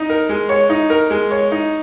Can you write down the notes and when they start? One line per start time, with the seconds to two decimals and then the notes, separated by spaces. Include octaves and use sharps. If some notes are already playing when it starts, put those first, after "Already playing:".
Already playing: D#4
0.09 A#4
0.29 G#3
0.49 C#5
0.69 D#4
0.90 A#4
1.10 G#3
1.31 C#5
1.52 D#4